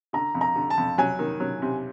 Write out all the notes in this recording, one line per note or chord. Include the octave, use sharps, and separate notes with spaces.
D3 A#5
F2
A#5
D3
A5
F2
F#3 G#5
D#3
F#3
C3